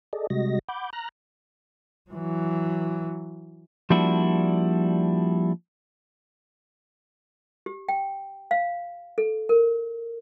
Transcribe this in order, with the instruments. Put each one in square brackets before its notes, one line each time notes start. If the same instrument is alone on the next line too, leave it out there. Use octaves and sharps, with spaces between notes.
[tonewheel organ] G#4 A4 D5 D#5
C3 G3 G#3 F#4 D#5 A#6
F#5 B5 D6 G6
A#5 F6 F#6 A#6
[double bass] E3 F#3
[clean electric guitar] F3 G3 A#3 D4 E4 F#4
[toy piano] G4
G5
F5
A4
A#4